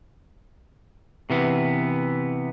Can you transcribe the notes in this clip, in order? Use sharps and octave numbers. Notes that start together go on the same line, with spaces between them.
C3 E3 B3